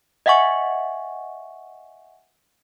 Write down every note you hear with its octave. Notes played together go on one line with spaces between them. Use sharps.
D#5 E5 F#5 G#5 C#6